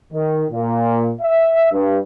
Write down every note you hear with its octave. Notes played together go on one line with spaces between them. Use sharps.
D#3
A#2
E5
G2